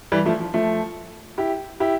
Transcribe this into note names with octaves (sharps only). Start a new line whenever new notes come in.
E3 G3
F3 A3
F3
F3 A3
E4 G4
E4 G4